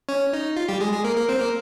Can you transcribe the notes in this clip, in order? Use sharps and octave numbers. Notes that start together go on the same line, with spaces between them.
C#4 C#5
D#4
F4
G3 G4
G#3 G#4
G#3 G#4
A#3 A#4
A#3 A#4
C4 C5
A#3 A#4